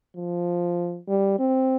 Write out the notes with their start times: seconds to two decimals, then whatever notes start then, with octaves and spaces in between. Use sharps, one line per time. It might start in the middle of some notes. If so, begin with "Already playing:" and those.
0.15 F3
1.08 G3
1.39 C4